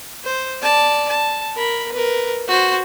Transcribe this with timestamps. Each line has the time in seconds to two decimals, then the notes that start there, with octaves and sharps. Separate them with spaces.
0.25 C5
0.62 D5 A5
1.08 A5
1.55 A#4 B5
1.92 A#4 B4
2.48 F#4 C5